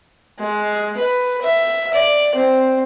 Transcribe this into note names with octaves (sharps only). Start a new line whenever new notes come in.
G#3
B4
E5
D5
C4